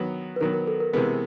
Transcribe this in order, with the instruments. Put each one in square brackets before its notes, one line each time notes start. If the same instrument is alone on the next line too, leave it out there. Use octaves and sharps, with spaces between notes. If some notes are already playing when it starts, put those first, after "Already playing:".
Already playing: [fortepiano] D#3 F#3 B3
[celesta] B4
[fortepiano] D#3 F#3 B3 [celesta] A#4
[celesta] A#4
A4
A#4
[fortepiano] C3 E3 G#3 B3 [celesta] A#4